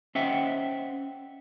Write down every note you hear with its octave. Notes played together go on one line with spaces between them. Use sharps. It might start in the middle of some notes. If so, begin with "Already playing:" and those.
C#4 C5 D#5 E5 F#5 G5